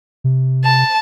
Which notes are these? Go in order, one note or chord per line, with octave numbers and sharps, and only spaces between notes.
C3
A5